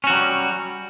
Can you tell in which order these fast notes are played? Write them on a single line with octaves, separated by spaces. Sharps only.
C#4 F#4 F#3 G3